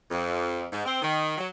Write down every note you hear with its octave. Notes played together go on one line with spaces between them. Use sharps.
F2
G#2
C4
D#3
F#3